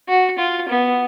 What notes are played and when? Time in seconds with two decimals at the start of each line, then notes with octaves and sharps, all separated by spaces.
0.08 F#4
0.39 F4
0.68 B3